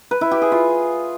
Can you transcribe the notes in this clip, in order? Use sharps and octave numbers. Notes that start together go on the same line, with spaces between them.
B4
E4
G4
G#4
F4